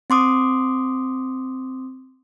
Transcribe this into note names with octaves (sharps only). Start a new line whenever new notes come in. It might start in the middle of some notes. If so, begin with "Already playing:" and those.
C4 C6 D6 D#6